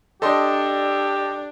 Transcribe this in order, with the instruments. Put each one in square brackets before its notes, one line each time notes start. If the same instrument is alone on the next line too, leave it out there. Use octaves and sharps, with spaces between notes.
[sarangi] D4 [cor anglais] G4 [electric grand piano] A4 D#5 C6